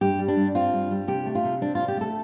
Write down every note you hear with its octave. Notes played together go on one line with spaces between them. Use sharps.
G2 G4
G3
D4
G2
C4 F4
G2
G3
C3 G4
A3
F4
C3
C4 D4
F4
C3
G4
A3 A4